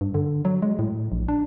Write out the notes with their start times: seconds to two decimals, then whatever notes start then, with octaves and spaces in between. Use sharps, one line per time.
0.01 G2
0.14 D3
0.45 F#3
0.62 G#3
0.79 A2
1.12 A#1
1.28 D4